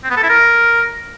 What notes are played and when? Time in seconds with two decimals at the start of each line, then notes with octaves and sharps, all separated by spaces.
0.04 C4
0.10 B3
0.17 A4
0.23 E4
0.29 A#4